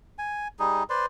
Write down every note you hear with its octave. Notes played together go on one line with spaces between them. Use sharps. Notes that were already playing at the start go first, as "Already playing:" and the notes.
G#5
G3 D#4 G#4
B4 C5 D5 C6